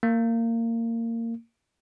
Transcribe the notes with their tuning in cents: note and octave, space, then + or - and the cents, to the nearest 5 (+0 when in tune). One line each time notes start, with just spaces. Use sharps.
A#3 -25